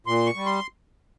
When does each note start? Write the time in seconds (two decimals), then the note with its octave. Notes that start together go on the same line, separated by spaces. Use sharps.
0.07 A#2 C6
0.26 C#6
0.36 G3
0.46 C6